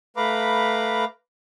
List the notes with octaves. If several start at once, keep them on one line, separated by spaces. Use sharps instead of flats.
A3 B4 F5 A#5 B5 D6